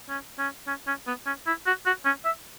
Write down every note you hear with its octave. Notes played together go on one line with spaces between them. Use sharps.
C#4
C#4
C#4
C#4
B3
C#4
E4
F#4
F#4
C#4
E5